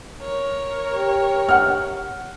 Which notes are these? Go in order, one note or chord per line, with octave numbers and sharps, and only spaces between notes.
A#4 C#5
G4
F#5 F6